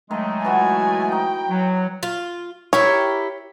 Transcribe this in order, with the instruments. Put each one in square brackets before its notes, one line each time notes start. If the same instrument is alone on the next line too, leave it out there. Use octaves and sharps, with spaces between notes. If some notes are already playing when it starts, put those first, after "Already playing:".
[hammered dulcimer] D#3 [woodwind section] F#3 G#3 A3
[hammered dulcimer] E3 F#4 [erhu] G#5
[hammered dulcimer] D#4 [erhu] G5
[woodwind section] F#3
[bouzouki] F4
[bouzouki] E4 G4 A#4 [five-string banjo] C#5